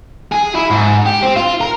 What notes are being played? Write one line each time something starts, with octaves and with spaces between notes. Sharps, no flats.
G#4
E4
G#2
G4
C4
F4
A#4